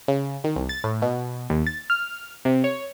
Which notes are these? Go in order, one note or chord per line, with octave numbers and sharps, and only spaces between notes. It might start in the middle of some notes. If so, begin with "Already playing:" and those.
C#3
D#3
C2
A6
A2
B2
D#2
A6
F6
C3
C#5